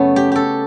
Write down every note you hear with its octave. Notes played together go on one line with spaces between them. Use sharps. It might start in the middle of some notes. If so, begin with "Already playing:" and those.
Already playing: F#2 C#3 A3 B3 C#4
G4
G4 A4